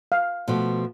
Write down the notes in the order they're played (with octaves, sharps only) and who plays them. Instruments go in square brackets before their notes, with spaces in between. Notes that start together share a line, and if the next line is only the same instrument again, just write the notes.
[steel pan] F5
[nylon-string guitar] B2 F3 A3